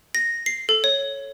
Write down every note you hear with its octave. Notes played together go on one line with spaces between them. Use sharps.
A#6
C7
A4
C#5